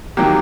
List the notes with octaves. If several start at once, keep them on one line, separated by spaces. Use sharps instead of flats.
D#3 F#3 A#3 G4